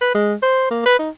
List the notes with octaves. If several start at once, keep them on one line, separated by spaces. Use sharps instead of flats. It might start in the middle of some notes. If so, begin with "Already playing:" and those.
B4
G#3
C5
A#3
B4
D#4